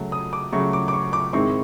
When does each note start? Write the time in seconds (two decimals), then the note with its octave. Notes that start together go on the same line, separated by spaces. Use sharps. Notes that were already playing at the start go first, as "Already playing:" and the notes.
Already playing: C#3 F#3 A3
0.12 D#6
0.33 D6
0.52 C#3 F#3 A3 C#6
0.73 D6
0.88 D6
0.93 C#6
1.13 D6
1.33 G#2 D#3 G#3 C4 E4 C#6